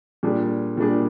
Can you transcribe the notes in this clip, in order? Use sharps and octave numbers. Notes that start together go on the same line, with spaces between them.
A#2 G3 D4 G#4
A#2 G3 D4 G#4